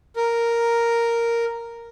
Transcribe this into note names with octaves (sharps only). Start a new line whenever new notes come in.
A#4